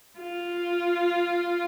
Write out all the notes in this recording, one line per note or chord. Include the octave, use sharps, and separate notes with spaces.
F4